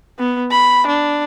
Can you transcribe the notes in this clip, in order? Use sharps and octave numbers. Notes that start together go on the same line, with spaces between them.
B3
B5
D4